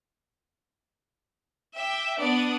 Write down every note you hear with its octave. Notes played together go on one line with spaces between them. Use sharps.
E5 G5 D6
B3 D4 D5 D#6 D7